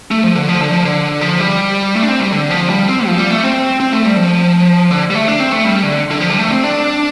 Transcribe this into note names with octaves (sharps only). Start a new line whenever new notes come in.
A3
F3
D3
F3
D3
F3
D3
F3
G3
A3
D4
C4
G3
D3
F3
G3
C4
F3
G3
A3
C4
C4
A3
G3
F3
D3
G3
A3
D4
C4
A3
G3
D3
D3
F3
G3
A3
C4
D4